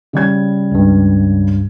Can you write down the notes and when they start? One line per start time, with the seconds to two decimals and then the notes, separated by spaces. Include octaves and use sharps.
0.13 C#3 G3 G#6
0.72 C#2 G2